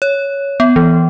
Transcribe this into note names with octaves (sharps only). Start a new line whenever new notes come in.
C#5
B3
E3